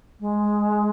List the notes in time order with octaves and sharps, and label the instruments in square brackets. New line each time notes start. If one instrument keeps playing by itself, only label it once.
[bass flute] G#3